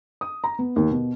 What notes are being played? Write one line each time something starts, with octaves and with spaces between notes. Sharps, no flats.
D#6
A#5
B3
D#2
B2